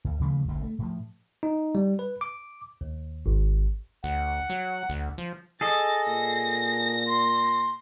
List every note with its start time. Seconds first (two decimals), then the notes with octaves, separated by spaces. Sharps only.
0.04 D2
0.19 D#2 C#3 F3 A3
0.48 D1 A1 D#2 D3
0.63 A3
0.79 A2 F3
1.43 D#4
1.75 G3
1.99 B4
2.21 D6
2.81 D#2
3.26 G#1
4.04 D2 F#5
4.49 F#3
4.89 D2
5.18 F3
5.61 G#4 A4 D#5 A6
6.08 A#2 A#6
7.07 C6